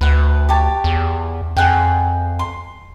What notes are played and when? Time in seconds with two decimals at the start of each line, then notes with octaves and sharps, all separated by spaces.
0.01 D2 B4 F#5
0.49 G4 C#5 A5
0.84 E2
1.57 F2 G#4 F#5 G5
2.39 C6